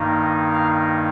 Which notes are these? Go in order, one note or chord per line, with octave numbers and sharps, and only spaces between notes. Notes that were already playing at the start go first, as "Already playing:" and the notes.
Already playing: G2 D#3 A#3 D#4
F5